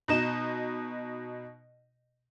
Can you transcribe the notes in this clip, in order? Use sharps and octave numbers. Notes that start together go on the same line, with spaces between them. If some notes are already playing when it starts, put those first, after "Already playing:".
B2 D#4 E7